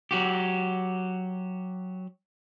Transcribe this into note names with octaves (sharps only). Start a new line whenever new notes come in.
F#3 F#4 G4